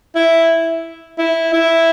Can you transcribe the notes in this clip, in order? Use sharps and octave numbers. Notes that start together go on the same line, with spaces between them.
E4
E4
E4